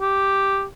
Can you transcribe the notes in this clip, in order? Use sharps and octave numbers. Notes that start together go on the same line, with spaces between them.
G4